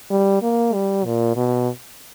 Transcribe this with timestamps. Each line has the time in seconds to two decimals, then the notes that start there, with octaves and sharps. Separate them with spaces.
0.11 G3
0.42 A#3
0.74 G3
1.05 A#2
1.36 B2